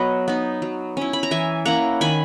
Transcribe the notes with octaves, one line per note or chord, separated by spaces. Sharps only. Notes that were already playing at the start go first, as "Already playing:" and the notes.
Already playing: F#3 B3 B4 C#5 D#5
B3 D#4
F#3
C#4 E4
B5
A#5
E3 E5 G#5
A#3 C#4 E4 F#5 A#5
D#3 G#5 B5